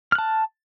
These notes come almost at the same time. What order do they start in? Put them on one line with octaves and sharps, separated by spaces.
F6 F#6 A5